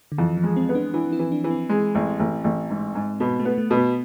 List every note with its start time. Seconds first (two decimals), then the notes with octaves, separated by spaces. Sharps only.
0.12 D3
0.18 F2 E3
0.37 F3
0.44 G#3
0.56 C4
0.69 B3
0.75 D4
0.94 E3 D4
1.12 E4
1.19 E3
1.32 D4
1.44 E3
1.51 C4
1.70 G#3
1.95 A1
2.19 A1
2.44 A1
2.70 G#2
2.95 G#2
3.20 B2 B3
3.40 A3
3.45 B3
3.58 A3
3.71 B2
3.77 B3